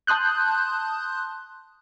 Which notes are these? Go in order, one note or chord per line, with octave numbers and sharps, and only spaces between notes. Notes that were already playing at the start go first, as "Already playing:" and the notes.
A5 C6 D#6 F#6 G6